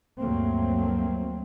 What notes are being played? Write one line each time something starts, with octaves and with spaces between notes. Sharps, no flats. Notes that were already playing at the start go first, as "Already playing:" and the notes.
D2 G2 F#3 A3 A#3 C4